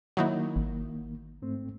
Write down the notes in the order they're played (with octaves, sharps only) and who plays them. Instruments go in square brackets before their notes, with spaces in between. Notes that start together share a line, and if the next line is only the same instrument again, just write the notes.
[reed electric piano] D#3 A#3 [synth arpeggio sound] F#3 D#4 E4
[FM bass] G#1
[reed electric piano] G#2 A3 C4